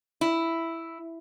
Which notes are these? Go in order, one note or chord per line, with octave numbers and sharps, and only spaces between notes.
E4